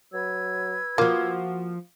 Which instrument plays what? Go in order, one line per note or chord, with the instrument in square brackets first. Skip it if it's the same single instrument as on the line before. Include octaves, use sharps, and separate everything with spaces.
[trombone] F#3 [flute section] B4 E6 G#6
[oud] F3 F4 [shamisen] A#3 [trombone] F#4